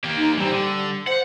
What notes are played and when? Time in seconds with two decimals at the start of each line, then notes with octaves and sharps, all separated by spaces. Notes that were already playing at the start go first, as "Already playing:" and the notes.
0.04 A#3 G4
0.17 D#4
0.37 E3 G3 C4
0.51 D3
1.07 C5 F#5